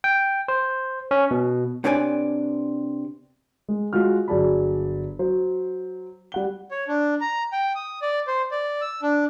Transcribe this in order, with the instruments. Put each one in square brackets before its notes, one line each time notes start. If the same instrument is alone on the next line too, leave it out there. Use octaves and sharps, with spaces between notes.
[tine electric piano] G5
C5
C#4
B2
[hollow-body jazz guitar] C3 D4 B4 C#5 D5 G#5
[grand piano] G#3
G#3 F4 F#4 F6
G1 F#3 G#4 D5 A5 B5
F#3 C5
G3 F#5 G7
[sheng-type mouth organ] C#5
D4
A#5
G5
D#6
D5
C5
D5
E6
D4